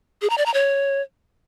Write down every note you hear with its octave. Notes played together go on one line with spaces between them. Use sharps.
G#4
A#5
D5
A#5
C#5